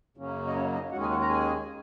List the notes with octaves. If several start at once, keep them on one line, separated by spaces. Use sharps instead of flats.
F#2 C#3 F#3 A#3 C#4
D#5
C#4 C#5
D#4 D#5
D#2 D#3 G#3 C#4 F#4 F#5
G#4 G#5
F#4 F#5
A#4 A#5
G#4 G#5